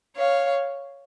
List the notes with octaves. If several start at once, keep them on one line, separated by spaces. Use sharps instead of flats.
C#5 F5